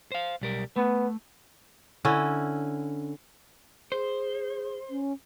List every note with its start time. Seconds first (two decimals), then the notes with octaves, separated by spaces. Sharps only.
0.12 C5 F5
0.41 B1 G3 A#4
0.76 A3 B3
2.05 D3 C#4 E4
3.92 G#4 C5
4.90 C#4